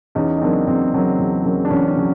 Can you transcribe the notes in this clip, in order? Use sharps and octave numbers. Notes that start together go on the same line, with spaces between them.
E2 C#4 D#4
D#4
C#3 F#3 A#3 C4 D4
E2 C4
C#3 F#3 A#3
E2
C#3 F#3 A#3
D4
E2 C#4
C#4
C#3 F#3